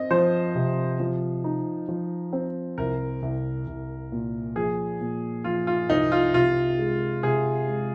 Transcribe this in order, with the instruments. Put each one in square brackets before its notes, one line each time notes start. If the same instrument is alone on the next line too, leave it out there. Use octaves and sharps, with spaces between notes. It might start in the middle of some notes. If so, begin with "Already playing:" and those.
Already playing: [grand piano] C4 [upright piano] D#5
[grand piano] F3 [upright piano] C5
[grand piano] C3
F3
D#4
F3
C4
[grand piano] C2 [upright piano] A#4
[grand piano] C2
C2
A#2
[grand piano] F3 [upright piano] G#4
[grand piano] A#2
[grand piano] F3 [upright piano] F4
[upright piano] F4
[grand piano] C2 [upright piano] D#4
[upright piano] F4
[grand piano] C3 [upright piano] F4
[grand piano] G#3
[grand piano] C3 [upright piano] G#4
[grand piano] G#3